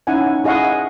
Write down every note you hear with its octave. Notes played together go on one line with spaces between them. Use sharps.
C#4 D#4 E4 F#5 G#5
E4 G#4 D#5 F5 F#5 C#6